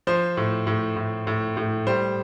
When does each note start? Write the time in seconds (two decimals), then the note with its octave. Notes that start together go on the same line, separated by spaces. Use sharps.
0.07 F3 C5
0.37 A2
0.67 A2
0.96 A2
1.27 A2
1.57 A2
1.87 G3 C5